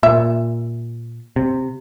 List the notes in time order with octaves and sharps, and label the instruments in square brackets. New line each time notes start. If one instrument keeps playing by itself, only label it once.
[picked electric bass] A#2 [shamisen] E5
[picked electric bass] C3